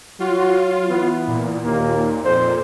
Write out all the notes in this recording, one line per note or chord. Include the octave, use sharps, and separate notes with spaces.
F#3 F4 F#4
E3 B3
A#2
D#2 A#3
F2 A#2 C5